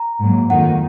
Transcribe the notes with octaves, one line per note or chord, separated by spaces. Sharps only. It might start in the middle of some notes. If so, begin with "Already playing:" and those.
Already playing: A#5
G#2 F#3 A#3
F2 D#3 A#3 D#4 F#5